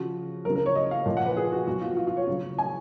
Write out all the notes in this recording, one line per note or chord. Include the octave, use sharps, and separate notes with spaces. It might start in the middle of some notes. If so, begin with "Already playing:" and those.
Already playing: C#3 F3 F#4
C#3 F#3 A#4
A#4
C#5
D#5
F5
A#2 F3
F#5
B4
G#4
F#4
B2 F#3 F#4
F4
F4
F4
C#5
C#3 F#3
G#5